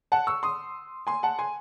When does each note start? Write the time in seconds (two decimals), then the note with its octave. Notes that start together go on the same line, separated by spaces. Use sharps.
0.12 F#5 A5
0.27 C#6 E6
0.43 C6 D#6
1.07 G#5 C6
1.23 F#5 A5
1.39 G#5 C6